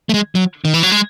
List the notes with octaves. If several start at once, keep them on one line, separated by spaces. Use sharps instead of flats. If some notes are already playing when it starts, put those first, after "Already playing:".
A3
G#3
F#3
D#3
E3
F#3
G#3